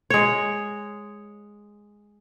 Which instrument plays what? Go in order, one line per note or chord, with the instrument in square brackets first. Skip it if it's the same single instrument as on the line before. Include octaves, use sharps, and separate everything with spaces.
[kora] G#3 C#5